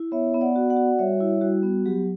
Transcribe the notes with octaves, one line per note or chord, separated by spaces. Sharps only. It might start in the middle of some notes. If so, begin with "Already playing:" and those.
Already playing: E4
B3 C#5 E5
B3
D5 F#5
F#4
D5 F#5
F#4
G3 C#5 E5
E4
G3 F#4
B3
F#3 G4